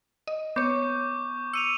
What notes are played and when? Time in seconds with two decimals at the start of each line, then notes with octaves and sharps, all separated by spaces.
0.28 D#5
0.56 B3 C#5 C#6 D6 G6
1.54 E6 C#7 D#7 F7